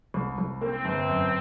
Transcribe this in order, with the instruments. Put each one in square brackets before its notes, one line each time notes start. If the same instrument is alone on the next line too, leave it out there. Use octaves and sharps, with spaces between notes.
[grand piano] C2
C2
[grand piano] A#3 [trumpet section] C4
[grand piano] G1
F#2